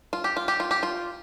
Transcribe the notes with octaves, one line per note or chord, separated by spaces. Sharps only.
F4
G4
F4
G4
F4
G4
F4